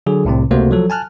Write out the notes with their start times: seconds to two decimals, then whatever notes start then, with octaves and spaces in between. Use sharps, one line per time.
0.06 D3 F#3 G#4
0.25 C2 A2 C3 C4
0.51 C#2 C3 A3 A#3 F#4 C5
0.71 F3 F#3 A4
0.90 G#5 A5 F6 F#6